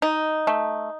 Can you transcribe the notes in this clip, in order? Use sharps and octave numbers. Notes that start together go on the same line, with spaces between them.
D#4
A3